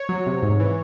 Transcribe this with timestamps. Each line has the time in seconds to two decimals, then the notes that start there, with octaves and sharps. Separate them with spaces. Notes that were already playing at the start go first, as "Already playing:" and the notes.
Already playing: C#5
0.09 F#3
0.26 C3
0.43 G#2
0.60 E3